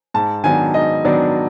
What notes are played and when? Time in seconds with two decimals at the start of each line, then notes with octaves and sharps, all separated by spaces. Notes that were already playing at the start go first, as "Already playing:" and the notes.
0.14 G#2 A5
0.44 D#3 F#3 B3 D4 G#5
0.74 G#2 D#5
1.05 D#3 F#3 B3 D4 D5